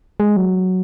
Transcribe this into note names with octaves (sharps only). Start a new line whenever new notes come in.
G#3
F#3